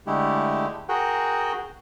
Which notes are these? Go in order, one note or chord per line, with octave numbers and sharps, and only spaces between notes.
D3 G#3 A3 E4 G4
F#4 G#4 A#4 F#5 G5